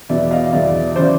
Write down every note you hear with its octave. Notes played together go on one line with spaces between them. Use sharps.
E2 B2 D5 E5
D#5 F5
E2 B2 D5 E5
C#3 E3 C5 D5